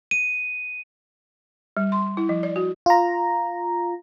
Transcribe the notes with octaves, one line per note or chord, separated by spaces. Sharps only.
D#7
G3
C6
E4
F3
D5
F#4
F4 A#5